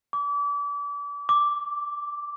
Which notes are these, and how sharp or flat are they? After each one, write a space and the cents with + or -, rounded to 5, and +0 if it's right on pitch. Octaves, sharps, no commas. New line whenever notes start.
D6 -35
D6 -5